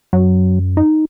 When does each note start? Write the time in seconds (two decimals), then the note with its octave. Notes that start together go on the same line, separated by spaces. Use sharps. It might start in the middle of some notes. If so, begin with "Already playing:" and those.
0.13 F#2 F#3
0.77 D#4